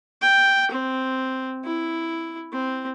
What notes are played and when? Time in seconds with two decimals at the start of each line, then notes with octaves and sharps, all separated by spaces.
0.22 G5
0.71 C4
1.65 E4
2.53 C4